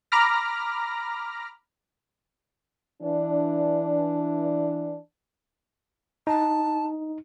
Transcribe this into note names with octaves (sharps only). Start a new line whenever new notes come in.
A#5 B5 D6 F6 A#6
E3 D4
D#4 A5